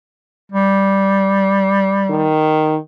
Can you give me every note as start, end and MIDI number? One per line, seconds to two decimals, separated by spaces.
0.52 2.34 55
2.10 2.78 51